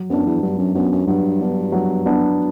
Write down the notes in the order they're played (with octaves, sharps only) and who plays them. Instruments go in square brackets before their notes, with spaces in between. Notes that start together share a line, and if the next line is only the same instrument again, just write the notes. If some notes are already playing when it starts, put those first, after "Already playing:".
Already playing: [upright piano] F#3
[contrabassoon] F#2 [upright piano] B3 D4
[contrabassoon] E2
[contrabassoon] G2 [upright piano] F#3
[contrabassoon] F#2
[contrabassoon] F#2 [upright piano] B3 D4
[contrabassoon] F#2
[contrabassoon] G2 [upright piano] F#3
[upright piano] B3 D4
F#3
B3 D4